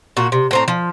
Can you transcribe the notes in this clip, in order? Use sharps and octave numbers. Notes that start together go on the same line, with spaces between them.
A#2 F#4
C3
A2 C4 A#5
F3